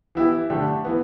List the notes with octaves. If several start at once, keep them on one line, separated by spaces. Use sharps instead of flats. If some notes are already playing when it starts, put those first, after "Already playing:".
E3 B3 E4 G4
D3 A3 D4 G4
E3 B3